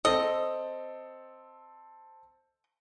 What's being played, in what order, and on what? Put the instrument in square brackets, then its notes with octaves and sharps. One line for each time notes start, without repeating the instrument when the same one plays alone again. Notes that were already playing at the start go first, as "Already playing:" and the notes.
[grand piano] C4 A4 [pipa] D#5